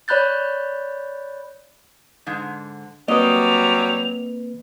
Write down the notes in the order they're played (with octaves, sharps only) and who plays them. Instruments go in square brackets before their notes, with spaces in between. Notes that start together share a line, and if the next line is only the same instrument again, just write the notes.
[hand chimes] C#5 D5 B5 F#6 G6 A6
[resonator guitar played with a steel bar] G#2 D3
[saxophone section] F#3 G3 [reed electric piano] A#3 C4 B4 [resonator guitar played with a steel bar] D#5 [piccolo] F7